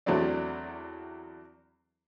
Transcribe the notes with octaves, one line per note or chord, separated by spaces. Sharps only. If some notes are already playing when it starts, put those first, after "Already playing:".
E2 F#3 A3 C4 D4